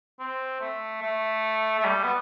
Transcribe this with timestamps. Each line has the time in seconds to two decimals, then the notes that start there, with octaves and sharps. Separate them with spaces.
0.20 C4
0.61 A3
1.03 A3
1.80 A3
1.86 G3
2.04 B3